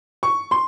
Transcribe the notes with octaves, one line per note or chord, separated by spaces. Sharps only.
C#6
C6